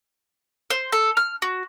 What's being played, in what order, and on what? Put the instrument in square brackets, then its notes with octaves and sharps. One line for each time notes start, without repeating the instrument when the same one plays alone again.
[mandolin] C5
A4
F6
F#4